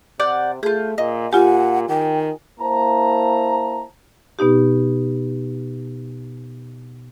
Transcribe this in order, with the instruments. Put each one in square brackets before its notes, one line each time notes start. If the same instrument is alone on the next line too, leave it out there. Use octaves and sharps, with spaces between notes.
[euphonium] C3 [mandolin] D5 F#5 G6
[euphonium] A3 [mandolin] F4 G6 [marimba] G#4
[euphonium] A#2 [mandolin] D#5
[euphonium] A#2 [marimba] F4 G4 [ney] F#5 [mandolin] G#5
[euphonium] D#3 [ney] G5
[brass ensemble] A#3 E4 C5 A5 A#5
[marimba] B2 B3 D#4 G4